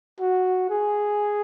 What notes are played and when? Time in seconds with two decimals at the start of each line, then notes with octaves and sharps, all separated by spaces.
0.20 F#4
0.70 G#4